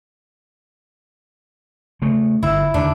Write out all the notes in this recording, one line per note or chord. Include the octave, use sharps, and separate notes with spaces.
C#3 A3
G1 E4
D#2 D3 D#3 D4